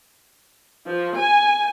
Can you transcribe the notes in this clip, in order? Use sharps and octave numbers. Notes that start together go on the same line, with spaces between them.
F3
G#5